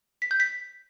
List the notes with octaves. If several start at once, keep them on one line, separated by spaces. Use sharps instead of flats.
B6
G6
B6